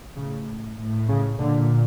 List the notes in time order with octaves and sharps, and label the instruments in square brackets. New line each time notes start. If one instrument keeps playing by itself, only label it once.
[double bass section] A2 C#3
A2
C#3
A#2 D3